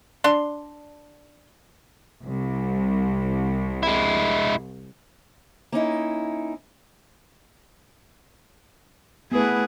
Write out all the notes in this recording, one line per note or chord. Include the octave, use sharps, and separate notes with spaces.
D4 C6
C2
G#3 E4
A#3 C#4 D#4 E4
A3 B3 E4 G#4 B4